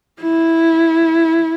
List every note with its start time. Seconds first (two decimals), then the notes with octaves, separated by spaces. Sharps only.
0.22 E4